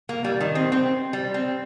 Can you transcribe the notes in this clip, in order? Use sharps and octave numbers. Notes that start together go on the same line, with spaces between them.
A#3
G3
D#3
C4
C4
G3
C4